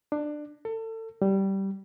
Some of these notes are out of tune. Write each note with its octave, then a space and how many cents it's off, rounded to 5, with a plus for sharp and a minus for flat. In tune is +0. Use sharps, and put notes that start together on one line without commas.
D4 +20
A4 +30
G3 -15